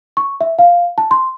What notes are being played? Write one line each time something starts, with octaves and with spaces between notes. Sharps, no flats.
C#6
E5
F5
A5
C6